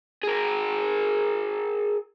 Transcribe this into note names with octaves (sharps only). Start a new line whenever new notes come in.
G#4 A#4